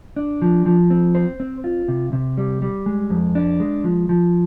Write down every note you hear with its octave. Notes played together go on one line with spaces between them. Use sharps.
D4
F3
F3
C4
C5
C4
F4
C3
C3
G3
G3
G#3
F2
D4
G#3
F3
F3